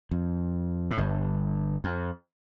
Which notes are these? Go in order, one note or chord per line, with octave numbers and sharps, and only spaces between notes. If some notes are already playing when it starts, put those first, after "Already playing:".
F2
A2
G1 G2
F2